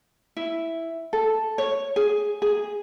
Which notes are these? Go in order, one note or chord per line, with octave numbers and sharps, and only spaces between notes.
E4
A4
C#5
G#4
G#4